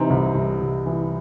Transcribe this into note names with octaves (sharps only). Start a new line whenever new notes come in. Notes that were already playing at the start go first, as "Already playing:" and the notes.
Already playing: C3 E3 C4 D#4
C2
C2
C3
E3